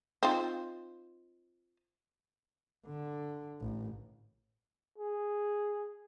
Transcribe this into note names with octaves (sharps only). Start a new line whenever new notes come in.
C4 D#4 F4
D3
A1
G#4